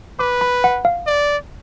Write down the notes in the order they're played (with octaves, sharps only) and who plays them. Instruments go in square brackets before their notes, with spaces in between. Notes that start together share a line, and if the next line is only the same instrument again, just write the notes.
[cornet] B4 [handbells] D6
[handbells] B5
F#5
F5
[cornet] D5